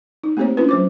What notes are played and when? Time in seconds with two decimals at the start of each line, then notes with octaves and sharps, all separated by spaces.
0.24 D#4
0.37 A3 A#3 C4 G4 C5 C#5
0.57 C#4 D4 E4 F4 B4
0.69 F#3 C5 D6